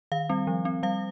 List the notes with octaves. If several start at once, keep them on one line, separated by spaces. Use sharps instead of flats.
D#3 F5
G3 C4
F3
C4
G3 F5